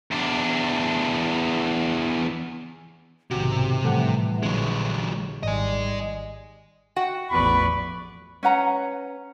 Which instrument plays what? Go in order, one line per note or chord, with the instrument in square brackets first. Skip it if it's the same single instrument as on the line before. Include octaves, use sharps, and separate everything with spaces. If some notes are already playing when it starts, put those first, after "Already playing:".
[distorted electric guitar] E2 D4
[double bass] B1 G#2 [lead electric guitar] C3 [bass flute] D#3 [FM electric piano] F#4
[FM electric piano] A2 A4 F#5 [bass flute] E3 [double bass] F3 G3
[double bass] A#1 [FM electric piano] A#2 D3 [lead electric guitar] F#3 G#3
[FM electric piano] G#1 [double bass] D#3 G3 [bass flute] D5 [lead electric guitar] D#5 G#5
[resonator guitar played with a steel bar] F#4 F#5 G5
[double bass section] A1 E2 F3 [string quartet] B4 D5 C#6 [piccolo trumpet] B5
[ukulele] C#4 B4 F#5 A#5